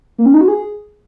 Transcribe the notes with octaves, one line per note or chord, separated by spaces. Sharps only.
A#3
C#4
D#4
F#4
G#4